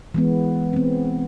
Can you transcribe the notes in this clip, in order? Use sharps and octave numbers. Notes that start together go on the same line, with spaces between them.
E3 G#3 B3
B3 C4